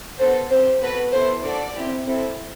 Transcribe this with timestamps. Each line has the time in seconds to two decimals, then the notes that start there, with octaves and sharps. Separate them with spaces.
0.19 B3 D4 F#4 A4 C5
0.50 C4 G4 C5
0.82 B3 F#4 A4 B4
1.13 B3 E4 A4 C5
1.44 D4 F#4 A4 D5
1.75 C4 E4 G4
2.06 C4 E4 A4